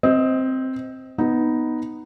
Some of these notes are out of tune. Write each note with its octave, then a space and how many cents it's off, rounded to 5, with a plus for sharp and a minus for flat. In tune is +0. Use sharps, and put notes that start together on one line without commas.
C4 +0 D#5 +20
B3 +0 D#4 +0